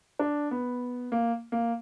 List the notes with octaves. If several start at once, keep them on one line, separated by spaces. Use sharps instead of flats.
D4
B3
A#3
A#3